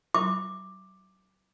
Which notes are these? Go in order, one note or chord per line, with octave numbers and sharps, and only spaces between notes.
D6